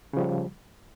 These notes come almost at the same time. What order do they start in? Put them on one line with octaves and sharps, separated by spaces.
C#3 F3 G3